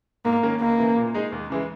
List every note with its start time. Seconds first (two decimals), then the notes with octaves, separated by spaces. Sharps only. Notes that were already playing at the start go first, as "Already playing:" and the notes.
0.25 G#2 A#3
0.43 D#3 A#3 C#4
0.60 C#2 A#3
0.78 C#3 E3
0.97 A#2
1.14 G#3 D#4 G#4
1.32 D#2
1.50 C#3 E3 G#3